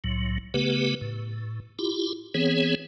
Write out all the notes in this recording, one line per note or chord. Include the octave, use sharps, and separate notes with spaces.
C2 A2 F#3
C#3 A3 B3 G4 B4
A2
E4 F4 G4
E3 B3 C4 G#4 C#5